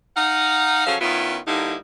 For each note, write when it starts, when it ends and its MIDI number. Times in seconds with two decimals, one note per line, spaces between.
0.16 0.85 63
0.16 0.85 77
0.16 0.85 78
0.86 0.96 49
0.86 0.96 53
0.86 0.96 54
0.86 0.96 61
0.86 0.96 69
0.86 0.96 77
1.01 1.38 51
1.01 1.38 59
1.01 1.38 61
1.01 1.38 64
1.01 1.38 65
1.47 1.76 43
1.47 1.76 50
1.47 1.76 55
1.47 1.76 58
1.47 1.76 63
1.47 1.76 64